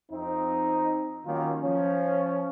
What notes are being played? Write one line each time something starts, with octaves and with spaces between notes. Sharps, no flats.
F2 C4 D#4
D#3 F#3 A#3 C#4 F4
F3 C#4